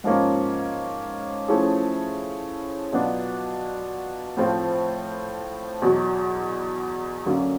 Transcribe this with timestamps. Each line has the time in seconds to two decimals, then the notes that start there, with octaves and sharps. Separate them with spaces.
0.04 G#2 F3 A#3 C#4
1.48 F3 A3 C#4 E4 G#4
2.92 B2 F#3 B3 D4 F4
4.37 A2 F3 A3 C4 F4
5.82 E2 B2 F#3
7.26 F#2 D3 F#3 A#3 C#4